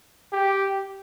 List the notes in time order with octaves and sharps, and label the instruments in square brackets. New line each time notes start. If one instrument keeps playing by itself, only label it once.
[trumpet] G4